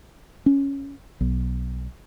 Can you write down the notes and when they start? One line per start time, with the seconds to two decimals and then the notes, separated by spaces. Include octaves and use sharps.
0.46 C#4
1.21 B1